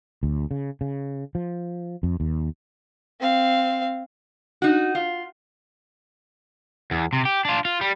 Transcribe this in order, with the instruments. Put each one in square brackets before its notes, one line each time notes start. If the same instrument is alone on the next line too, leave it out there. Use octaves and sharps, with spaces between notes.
[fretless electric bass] D2
C#3
C#3
F3
F2
D#2
[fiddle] C4 F5
[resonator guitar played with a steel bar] D#4 F#4
F4
[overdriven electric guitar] E2
C3
G4
D4 F4
F4
G3